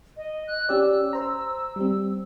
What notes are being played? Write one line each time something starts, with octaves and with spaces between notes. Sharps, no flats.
D#5
F#6
C#4 G4 D5 E6
C5 A#5
G3 C4